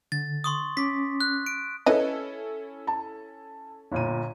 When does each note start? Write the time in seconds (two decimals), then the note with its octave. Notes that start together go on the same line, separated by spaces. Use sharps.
0.12 D3 A6
0.44 C6 C#6 D#6
0.77 C#4 D6 B6
1.21 F#6
1.46 D7
1.86 C#4 E4 A4 B4 D#5
2.87 A5
3.92 G1 A#2 D#7